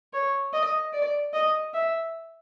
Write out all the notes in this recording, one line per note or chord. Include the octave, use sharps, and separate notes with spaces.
C#5
D#5
D5
D#5
E5